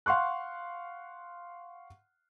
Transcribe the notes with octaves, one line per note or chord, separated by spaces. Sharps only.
F5 F#5 C6 C#6 F#6